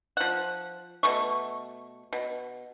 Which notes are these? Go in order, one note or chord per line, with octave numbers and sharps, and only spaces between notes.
F3 F#5
B2 A3 C#6
B2